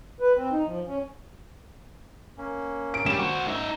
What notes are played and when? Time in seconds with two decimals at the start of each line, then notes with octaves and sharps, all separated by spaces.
0.20 B4
0.36 C4
0.52 D#4
0.66 F3
0.86 C#4
2.37 A#3 C#4
2.94 D7
3.06 G3 E7
3.19 F#4 C5
3.48 D#4 E5